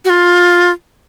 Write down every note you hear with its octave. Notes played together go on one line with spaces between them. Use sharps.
F#4
F4